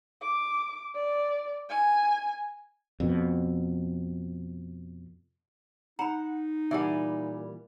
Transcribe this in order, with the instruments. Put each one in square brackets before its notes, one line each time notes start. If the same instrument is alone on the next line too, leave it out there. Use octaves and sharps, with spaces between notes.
[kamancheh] D6
D5
G#5
[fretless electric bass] F2 B2
[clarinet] D#4 [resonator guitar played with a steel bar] F#5 [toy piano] A#5 B5
[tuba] A#2 [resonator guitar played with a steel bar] E3 G3 G#5 [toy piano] E5 F#5